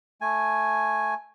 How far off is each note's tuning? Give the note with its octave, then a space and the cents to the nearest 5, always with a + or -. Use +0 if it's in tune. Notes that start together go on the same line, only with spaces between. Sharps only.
A3 +0 G#5 +0